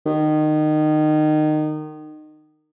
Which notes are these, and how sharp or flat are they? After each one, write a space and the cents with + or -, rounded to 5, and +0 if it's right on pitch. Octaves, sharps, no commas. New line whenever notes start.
D#3 -25